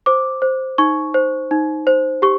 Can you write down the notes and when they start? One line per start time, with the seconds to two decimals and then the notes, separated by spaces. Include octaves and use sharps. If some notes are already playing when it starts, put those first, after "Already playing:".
0.06 C5 D6
0.42 C5
0.78 D#4 C#6
1.14 C5
1.51 D#4
1.87 C5
2.22 G4 C#6